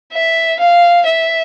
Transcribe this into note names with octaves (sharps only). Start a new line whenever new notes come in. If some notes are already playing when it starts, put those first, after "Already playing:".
E5
F5
E5